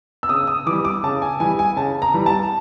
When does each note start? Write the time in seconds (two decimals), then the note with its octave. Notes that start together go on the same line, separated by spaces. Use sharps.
0.23 E6
0.29 C#3 D#6
0.47 D#6
0.66 E3 G3 D6
0.85 D6
1.03 C#3 A5
1.22 G#5
1.40 E3 G3 G#5
1.59 G#5
1.76 C#3 A5
2.02 A#5
2.14 E3 G3
2.26 A5